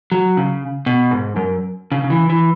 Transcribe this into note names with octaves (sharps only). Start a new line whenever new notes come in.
F#3
C#3
B2
G#2
F#2
C#3
C#3
E3
E3